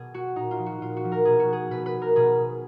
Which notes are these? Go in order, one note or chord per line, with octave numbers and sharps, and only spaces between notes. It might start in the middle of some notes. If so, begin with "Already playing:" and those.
Already playing: B2 G#4
F#4
A#2 D#4
F4
F3
F#4
A#2 F4
F#4
F3
A#4
B2 G#4
F#4
G#4
B2 B4
B4
A#4
B2 G#4